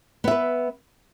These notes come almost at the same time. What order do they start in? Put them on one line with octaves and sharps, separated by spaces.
B3 E5 B4